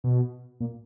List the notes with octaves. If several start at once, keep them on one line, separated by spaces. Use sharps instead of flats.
B2
A#2